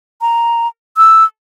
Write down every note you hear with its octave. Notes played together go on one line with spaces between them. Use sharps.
A#5
E6